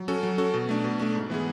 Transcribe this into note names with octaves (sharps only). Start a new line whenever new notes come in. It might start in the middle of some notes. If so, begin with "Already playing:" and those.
Already playing: F#3
C#4 F#4 A4
F#3
C#4 F#4 A4
B2
A3 D4
B2
A3 D4
G#2
E3 B3 E4 G#4